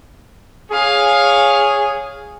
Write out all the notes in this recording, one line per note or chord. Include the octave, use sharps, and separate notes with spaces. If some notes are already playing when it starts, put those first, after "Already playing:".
G#4 C#5 F5